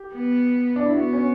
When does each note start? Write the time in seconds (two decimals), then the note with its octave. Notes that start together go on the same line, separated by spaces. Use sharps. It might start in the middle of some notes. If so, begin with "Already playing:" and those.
Already playing: G4
0.13 B3
0.76 D4
0.86 E4
0.94 B3 F#4
1.13 C#4